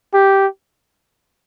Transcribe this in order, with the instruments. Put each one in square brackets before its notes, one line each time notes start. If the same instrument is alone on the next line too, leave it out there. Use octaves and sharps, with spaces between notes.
[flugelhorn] G4